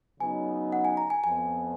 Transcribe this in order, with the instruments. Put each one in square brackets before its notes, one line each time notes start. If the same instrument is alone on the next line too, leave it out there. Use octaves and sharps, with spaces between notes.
[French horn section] C#3 F#3 B3 D#4 [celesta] G#5
[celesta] F#5
G#5
A#5
G#5
[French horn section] F2 F3 B3 [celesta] G#5